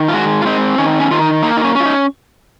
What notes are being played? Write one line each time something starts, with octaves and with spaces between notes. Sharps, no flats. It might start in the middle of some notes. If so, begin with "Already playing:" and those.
Already playing: D#3
F4
G#3 F#4
F4
C4 D#4
D#3 C#4
C#4
D#3 F4
D#4
A#3 D#4
D#4
C#4
C#4
F4
D#4